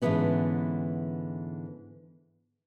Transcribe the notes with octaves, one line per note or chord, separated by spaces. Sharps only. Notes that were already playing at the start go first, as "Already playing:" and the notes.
G#2 D3 E3 F#3 B3 C#4